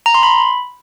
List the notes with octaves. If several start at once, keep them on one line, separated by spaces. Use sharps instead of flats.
A#5
C6
B5